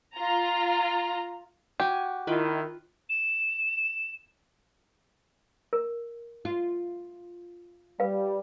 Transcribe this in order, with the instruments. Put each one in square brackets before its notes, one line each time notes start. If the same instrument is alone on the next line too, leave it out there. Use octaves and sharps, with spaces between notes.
[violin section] F4 A#5
[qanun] F#4 G#5 [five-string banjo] G4
[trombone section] D#3 E4 [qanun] F4 B4 G5
[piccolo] E7
[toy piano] A#4
[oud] F4
[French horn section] G3 [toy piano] B4 F5